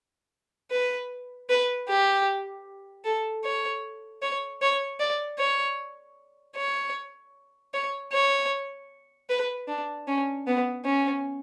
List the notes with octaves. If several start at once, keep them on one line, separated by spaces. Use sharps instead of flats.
B4
B4
G4
A4
C#5
C#5
C#5
D5
C#5
C#5
C#5
C#5
B4
D4
C#4
B3
C#4